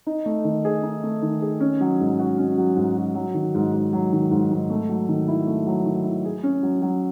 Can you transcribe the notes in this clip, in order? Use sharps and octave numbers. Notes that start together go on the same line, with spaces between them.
D#4
A3
D#3
G#4
D#4
A3
D#3
G#4
C#4
F#3
G#2
F#4
C#4
F#3
G#2
F#4
F#3
D#3
G#2
G#2
F#3
D#3
G#2
G#2
A3
F#3
D#3
E4
A3
F#3
D#3
E4
G#4
C#4
F#3
F#3